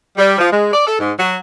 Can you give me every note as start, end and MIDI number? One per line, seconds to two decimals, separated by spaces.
0.17 0.36 55
0.38 0.49 53
0.52 0.69 56
0.73 0.83 74
0.86 0.96 69
0.98 1.10 44
1.18 1.36 54